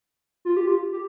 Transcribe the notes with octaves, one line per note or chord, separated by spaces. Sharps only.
F4
G4
F4
G4